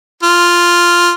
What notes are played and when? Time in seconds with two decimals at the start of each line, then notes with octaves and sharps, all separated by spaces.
0.23 F4